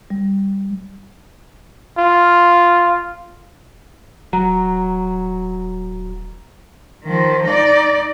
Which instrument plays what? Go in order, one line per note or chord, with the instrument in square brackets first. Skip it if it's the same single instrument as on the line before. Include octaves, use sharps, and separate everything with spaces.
[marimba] G3
[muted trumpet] F4
[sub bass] D#1 [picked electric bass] F#3 [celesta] A#5
[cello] D#3 F3
D#4 D5